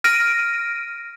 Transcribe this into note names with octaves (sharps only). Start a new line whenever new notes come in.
F6 A#6 D7 D#7